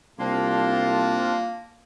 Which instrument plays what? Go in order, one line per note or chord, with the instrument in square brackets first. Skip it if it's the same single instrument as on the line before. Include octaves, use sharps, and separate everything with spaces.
[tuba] C2 [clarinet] A#3 [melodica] C4 D4 C6 [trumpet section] F4 A5